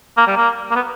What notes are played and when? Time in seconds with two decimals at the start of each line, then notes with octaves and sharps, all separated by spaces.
0.17 A#3
0.27 G3
0.37 A#3
0.71 A#3
0.76 B3